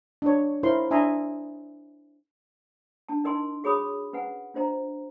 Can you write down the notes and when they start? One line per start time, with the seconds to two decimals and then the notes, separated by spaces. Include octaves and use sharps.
0.22 D4 C#5
0.63 D#4 E4 A#4 C5 C#5 C6
0.91 D4 E5 G#5 A#5 C6 D#6
3.09 D4 A5
3.24 D4 D#4 A#4 D#5 G#5 C6
3.64 F#4 G#4 C#5 B5 D#6
4.13 C#4 B4 F#5 G#5
4.54 D4 F4 C5 D#5 A#5